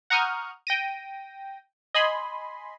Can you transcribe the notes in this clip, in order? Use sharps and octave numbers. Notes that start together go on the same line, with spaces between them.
F#5 A#5 C#6 D#6 F6 G6
G5 A#6 D#7
D#5 G#5 B5 C6